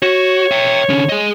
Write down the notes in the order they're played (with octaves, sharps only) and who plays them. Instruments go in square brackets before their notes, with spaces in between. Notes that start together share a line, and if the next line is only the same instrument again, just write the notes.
[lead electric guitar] F#4 [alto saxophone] C#5
[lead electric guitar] E5 G5
D3 C#4
G#4 D#5